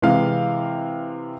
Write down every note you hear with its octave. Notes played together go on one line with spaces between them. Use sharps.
C3 E3 G#3 F5